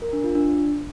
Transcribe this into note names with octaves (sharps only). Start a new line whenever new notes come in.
A#4
D4
F4
D4